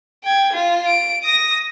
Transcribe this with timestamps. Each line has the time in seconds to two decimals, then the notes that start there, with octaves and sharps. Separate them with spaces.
0.24 G5 G#6
0.53 F4
0.87 D7
1.23 D#6 A#6